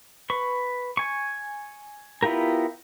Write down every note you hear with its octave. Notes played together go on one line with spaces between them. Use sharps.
B4 C#6
G#5 C#6
B3 E4 F4 G4 A#4